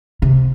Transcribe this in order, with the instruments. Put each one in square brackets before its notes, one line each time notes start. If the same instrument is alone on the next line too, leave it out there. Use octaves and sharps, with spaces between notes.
[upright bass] C3